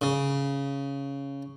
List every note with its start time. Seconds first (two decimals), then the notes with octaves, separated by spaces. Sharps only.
0.02 C#3